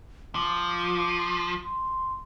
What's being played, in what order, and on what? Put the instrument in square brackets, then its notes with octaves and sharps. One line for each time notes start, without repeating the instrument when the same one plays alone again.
[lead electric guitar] F3 [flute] D6
[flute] C6